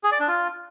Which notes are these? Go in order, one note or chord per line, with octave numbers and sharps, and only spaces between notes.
G#4
D5
D4
F4